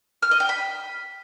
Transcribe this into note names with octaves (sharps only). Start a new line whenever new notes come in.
F6
D#5
G5
B5